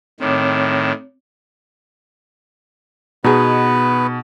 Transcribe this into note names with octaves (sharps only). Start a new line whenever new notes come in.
A2 D#3 C4 C#5 D6
B2 B3 D#4 G#4 B4